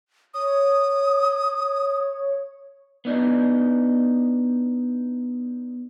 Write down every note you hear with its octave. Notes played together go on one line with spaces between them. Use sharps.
C#5 D#6
B3 D4 D#4